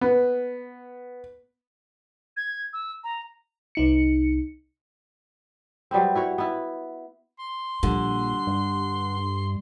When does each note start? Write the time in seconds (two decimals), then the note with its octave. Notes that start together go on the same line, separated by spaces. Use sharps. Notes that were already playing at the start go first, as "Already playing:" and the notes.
0.01 B3
2.37 G#6
2.73 E6
3.04 A#5
3.75 C2 D#4 C#7
5.91 F#3 G3 B3 C4
6.15 E4 F#4 C#5
6.38 B3 E4
7.39 C6
7.83 A#1 D3 G3
8.47 G2